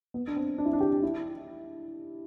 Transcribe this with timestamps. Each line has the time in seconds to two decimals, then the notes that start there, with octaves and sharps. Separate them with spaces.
0.14 B3
0.27 D4
0.36 C4
0.58 D4
0.65 E4
0.73 D4
0.80 G4
1.03 E4